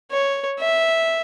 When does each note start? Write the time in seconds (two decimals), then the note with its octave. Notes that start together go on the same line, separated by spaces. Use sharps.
0.11 C#5
0.60 E5